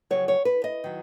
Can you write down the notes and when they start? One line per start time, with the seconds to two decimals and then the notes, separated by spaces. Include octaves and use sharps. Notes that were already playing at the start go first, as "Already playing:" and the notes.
0.10 F2 C#3 F#3 C#5
0.28 C#5
0.45 B4
0.64 D#5
0.84 D#3 F#3